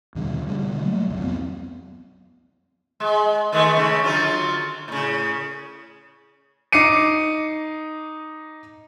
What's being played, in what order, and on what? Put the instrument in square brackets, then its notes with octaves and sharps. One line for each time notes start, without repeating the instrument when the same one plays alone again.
[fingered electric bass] D#2 B2 D3 G3
D3 G#3
B2 D3 G3
F#3 A3 A#3
C2 F#2
F2 F#3 B3 C4
[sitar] G#3
D#3 G#3 A3
C#3 A3
D3 F#3 F4
A2 C#3
[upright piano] D#4 D6 C7 C#7 D#7